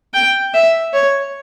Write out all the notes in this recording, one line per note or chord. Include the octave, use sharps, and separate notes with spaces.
G5
E5
C#5